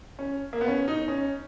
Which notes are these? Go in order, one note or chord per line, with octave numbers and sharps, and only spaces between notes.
C#4
A#3
B3
C#4
D#4
C#4